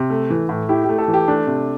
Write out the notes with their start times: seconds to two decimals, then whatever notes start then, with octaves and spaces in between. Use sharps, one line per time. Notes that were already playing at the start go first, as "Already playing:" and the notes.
Already playing: C3
0.10 A3
0.30 E3
0.49 A2
0.69 E4 G4
0.84 G4
0.89 A3
0.98 A4
1.08 E3
1.14 G4
1.28 A3 D4
1.47 C3